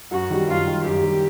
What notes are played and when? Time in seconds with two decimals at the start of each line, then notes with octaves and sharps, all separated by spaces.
0.11 F#2 F#4
0.30 D#3 G3
0.48 F#2 F4
0.67 D#3 G3
0.84 F#2 G4
1.03 D#3 G3